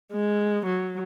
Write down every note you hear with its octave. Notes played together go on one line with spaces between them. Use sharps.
G#3
F#3